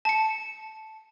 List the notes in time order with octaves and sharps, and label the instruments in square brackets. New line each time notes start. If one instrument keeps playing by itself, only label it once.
[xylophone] A5 C#7